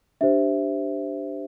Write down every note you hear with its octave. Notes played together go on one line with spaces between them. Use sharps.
D4 G4 C5 E5